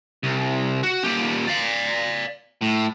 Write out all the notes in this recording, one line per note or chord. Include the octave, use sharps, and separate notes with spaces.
C2
F#4
A#2 G4
D5 F5
A2